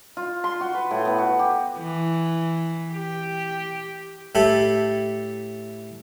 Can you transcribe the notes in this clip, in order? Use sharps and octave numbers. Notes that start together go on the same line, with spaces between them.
F4
C6
F#4
B4
A2
B3
F#4
G4
E3
G4
A2 E4 G4 A4 B5